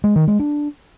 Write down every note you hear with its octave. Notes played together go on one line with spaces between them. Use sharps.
G#3
D#3
G#3
D4